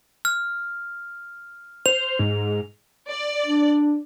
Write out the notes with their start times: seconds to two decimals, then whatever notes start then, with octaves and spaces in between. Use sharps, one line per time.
0.25 F6
1.86 C5 F7
2.19 G#2
3.08 D5
3.46 D4